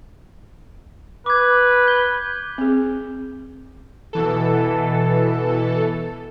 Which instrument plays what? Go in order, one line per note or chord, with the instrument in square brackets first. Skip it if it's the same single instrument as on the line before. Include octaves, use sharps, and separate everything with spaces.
[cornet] B4 [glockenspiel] D6 G#6
[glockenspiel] G6 G7
[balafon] C4 G#4
[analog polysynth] B2 E3 A4